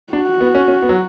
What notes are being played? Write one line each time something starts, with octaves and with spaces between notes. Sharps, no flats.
D4 F#4
B3
C#4
C#4
B3
F#3